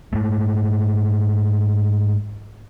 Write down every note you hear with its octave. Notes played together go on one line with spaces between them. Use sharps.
G#2 A3